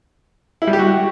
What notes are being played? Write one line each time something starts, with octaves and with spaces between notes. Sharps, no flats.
E4
G3
G4
F#4